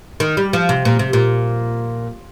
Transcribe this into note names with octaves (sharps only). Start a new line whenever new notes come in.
D#3
G3
F3
C3
A#2
C3
A#2